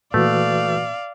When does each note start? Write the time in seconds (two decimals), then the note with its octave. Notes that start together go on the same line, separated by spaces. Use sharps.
0.14 A#2 E3 A3 F#4 B4 D5 F5